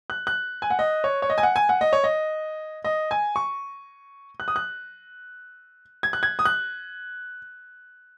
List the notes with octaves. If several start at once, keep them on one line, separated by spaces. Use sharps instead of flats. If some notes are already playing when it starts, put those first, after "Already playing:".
F#6
F#6
G#5
F#5
D#5
C#5
C#5
D#5
G#5
F#5
G#5
F#5
D#5
C#5
D#5
D#5
G#5
C#6
F#6
D#6
F#6
G#6
F#6
G#6
D#6
F#6